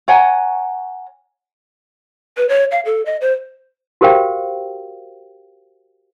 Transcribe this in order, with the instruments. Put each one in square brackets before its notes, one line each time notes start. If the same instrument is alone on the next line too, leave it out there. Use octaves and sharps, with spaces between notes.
[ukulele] C#5 F#5 G#5 A#5
[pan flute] B4
C#5
F5
A4
D#5
C5
[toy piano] F#4 G4 A#4 C5 F5 G5